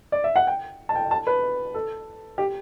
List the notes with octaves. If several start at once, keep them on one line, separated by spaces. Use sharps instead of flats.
D5
E5
F#5
G5
A5
G5
A5
B4
A4
G4